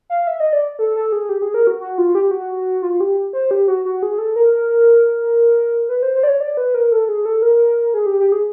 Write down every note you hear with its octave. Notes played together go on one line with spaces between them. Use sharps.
F5
E5
D#5
D5
A4
A4
G#4
G4
G#4
A#4
F#4
F#4
F4
G4
F#4
F4
G4
C5
G4
F#4
F#4
G#4
A4
A#4
A#4
A#4
B4
C5
C5
D5
C#5
D5
B4
A#4
A4
G#4
A4
A#4
G#4
G4
G4
G#4